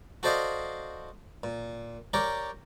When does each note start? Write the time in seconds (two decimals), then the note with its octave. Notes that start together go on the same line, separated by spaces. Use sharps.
0.23 F#4 A4 C5 D5 D#5 F5
1.43 A#2
2.13 G4 A#4 C#5 D5 A#5